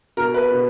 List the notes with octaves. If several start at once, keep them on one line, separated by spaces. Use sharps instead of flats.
B2 A#4
B4
B2